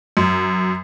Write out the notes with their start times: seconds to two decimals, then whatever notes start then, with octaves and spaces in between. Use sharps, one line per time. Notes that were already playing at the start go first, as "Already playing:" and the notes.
0.17 F#2